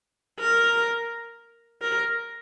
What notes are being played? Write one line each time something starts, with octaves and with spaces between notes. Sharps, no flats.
A#4
A#4